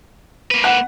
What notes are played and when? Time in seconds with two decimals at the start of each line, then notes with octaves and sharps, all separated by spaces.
0.51 A#3 B4
0.64 F#5